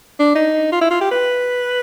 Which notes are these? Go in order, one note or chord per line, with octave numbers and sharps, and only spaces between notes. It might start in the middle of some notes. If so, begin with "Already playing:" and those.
D4
D#4
F4
E4
F4
G4
B4